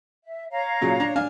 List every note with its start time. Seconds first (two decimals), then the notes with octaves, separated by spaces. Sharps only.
0.25 E5
0.51 C#5 F5 A#5
0.82 A#2 C#3 F#3
1.00 D4
1.16 D4 F5 G#5